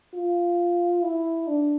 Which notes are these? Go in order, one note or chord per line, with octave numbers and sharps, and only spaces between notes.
F4
E4
D4